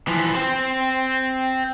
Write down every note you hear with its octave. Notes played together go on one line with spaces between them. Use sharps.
E3 F3
C4 C5